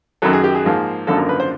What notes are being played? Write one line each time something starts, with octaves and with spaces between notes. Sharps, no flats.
F#2 D#3 F#3 A4
G#4
G4
G#4
G#2 F3 A#3
G#1 F#2 D3 F3 A#3 A4
A#4
B4
C5